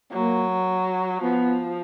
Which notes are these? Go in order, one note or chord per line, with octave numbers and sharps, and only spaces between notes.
F#3 A#3
F3 B3